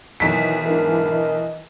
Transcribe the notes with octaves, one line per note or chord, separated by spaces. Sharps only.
B1 D#3 E3 B6
G#2 D4 A#4
D#5